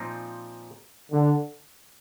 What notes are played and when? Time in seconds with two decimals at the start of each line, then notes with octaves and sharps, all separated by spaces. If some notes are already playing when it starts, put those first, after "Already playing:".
Already playing: A#2 F3 C4 D#4
1.12 D3